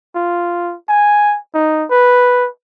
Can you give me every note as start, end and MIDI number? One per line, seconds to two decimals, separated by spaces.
0.15 0.74 65
0.89 1.37 80
1.54 1.85 63
1.90 2.48 71